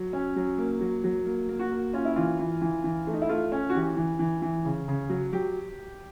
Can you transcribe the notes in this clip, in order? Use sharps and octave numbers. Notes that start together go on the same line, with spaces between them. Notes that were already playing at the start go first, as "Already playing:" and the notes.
Already playing: F#3
C#4
F#3
A#3
F#3
F#3
A#3
A#3
F#4
A#3
C#4 F4
E4
E3 F4
E3
E3
E3
A3
D#4
E4
A3 F4
C#4
F#4
E3 G4
E3
E3
E3
C#3
C#3
F#3
F#3 G4